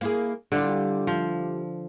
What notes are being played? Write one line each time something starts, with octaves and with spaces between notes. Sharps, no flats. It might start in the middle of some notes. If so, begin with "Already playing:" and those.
A#3 E4 G#4
D3 G3 E4 F4
F3